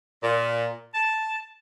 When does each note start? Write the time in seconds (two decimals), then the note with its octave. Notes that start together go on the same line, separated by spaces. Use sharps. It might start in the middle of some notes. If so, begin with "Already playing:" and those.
0.23 A#2
0.95 A5